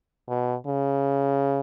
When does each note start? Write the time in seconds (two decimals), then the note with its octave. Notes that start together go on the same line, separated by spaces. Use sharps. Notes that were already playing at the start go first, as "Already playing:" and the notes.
0.29 B2
0.67 C#3